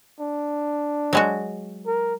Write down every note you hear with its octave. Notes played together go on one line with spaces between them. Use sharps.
D4
F#3 G#3 F#4
A#4